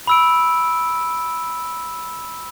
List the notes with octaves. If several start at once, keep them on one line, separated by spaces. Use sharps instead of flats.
B5 E6 D7